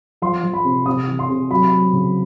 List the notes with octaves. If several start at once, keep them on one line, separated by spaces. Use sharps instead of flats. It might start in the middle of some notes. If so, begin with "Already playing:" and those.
F3 C6
F3
B5
C3
C3 D#6
E3
C6
C3
F#3 B5
F#3
C#3